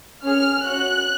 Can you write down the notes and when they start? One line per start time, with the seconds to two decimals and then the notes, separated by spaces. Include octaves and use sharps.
0.24 C#4 G#4 F6
0.65 C#4 F#4 F#6